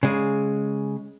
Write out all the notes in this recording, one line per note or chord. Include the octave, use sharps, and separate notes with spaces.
C#3 G#3